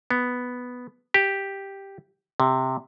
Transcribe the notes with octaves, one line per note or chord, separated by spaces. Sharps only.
B3
G4
C3